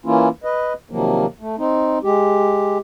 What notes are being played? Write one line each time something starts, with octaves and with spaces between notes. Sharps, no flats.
E3 A#3 C#4 E4 F4
B4 D#5
C3 D#3 F3 F#3 A#3
A3
C4 D#4
G#3 G4